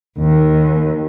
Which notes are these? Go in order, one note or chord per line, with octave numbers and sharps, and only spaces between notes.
D#2